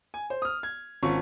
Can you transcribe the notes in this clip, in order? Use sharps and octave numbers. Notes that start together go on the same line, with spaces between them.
G#5
C5
D#6 F6
G#6
G#1 C#4 F4 C#6